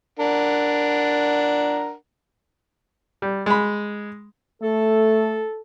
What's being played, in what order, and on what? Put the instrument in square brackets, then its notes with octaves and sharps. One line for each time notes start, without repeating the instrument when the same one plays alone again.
[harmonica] D4 A#4 F#5
[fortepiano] G3
G#3 B5
[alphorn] A3 [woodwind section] A4